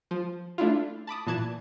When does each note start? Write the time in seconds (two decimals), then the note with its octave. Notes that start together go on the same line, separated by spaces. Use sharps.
0.11 F3
0.58 A3 D4 E4 F4
1.07 A5 B5 D6 D#6
1.27 A#2 E3 A5 F#6 G#6 E7